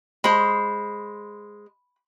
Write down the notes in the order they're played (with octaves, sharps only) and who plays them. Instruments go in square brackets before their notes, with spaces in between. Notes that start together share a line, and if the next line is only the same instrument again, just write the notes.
[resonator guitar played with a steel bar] G#3 C5 [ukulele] B5